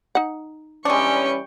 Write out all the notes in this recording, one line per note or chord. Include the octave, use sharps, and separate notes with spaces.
D#4 F#5
E3 G3 G#3 C#4 D4 G5 C#6